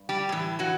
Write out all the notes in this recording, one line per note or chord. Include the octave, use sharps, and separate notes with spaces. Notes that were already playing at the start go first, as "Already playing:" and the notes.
Already playing: G2
G3 G4
A2 E3
F#3 F#4